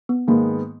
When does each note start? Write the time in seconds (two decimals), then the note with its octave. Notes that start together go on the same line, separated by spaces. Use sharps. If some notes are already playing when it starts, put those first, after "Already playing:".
0.09 B3
0.27 G#2 D#3 G#3 A#3 B3